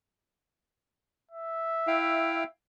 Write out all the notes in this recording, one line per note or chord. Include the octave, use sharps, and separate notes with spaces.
E5
E4 F5 G5